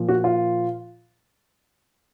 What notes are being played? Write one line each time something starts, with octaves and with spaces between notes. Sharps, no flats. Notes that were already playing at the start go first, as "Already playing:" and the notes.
Already playing: A#2 F3
F#4
F4